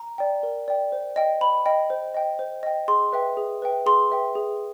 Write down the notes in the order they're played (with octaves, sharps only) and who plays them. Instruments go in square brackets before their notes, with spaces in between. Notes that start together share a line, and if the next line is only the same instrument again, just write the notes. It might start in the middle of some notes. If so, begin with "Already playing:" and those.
Already playing: [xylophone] A#5
D5 G5
A#4
D5 G5
C5
D#5 G5
C5 B5
D#5 G5
C5
D#5 G5
C5
D#5 G5
G#4 C6
B4 E5 G5
G#4
B4 E5 G5
G#4 C6
B4 E5 G5
G#4